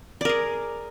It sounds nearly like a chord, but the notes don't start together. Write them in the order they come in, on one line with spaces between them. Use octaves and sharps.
D5 A#4 G#4